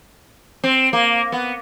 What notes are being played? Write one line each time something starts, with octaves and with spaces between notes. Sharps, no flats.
C4
A#3
B3